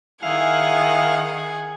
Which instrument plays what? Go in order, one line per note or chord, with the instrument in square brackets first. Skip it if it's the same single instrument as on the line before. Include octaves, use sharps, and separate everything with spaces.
[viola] D#3 F#5 [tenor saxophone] E4 [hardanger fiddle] G#4 G#5 [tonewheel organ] F5